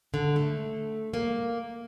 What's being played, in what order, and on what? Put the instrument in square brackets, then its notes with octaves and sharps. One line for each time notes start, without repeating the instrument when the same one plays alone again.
[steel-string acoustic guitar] D3
A3
A#3